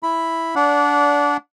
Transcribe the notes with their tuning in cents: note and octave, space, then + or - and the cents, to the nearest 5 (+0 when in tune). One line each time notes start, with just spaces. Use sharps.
E4 +0 B5 +0
D4 -20 D5 -30 F#5 -20